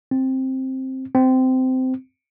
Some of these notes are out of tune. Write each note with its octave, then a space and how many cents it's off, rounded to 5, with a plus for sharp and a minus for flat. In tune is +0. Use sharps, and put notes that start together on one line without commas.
C4 +5
C4 -20